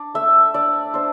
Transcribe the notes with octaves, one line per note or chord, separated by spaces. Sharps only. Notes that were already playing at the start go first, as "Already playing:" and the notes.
Already playing: D4 D5
A3 E5
D4 D5
D4 C5